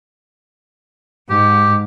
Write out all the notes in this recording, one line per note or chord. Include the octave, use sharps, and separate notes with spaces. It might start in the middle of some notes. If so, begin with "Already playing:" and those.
G#2 G4